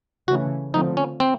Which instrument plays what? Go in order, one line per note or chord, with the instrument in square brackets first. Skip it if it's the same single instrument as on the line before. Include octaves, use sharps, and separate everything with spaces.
[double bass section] C#3 E3 A3 C#4 [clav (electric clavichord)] F#4
[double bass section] D3 F3 A3 C4 [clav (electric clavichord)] D#4
[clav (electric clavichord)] C#4
C4